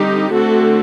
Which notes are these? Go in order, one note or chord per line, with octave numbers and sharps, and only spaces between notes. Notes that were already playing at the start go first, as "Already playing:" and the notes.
Already playing: D3 G3 C4 D#4 G4
D3 A3 C4 F#4 A4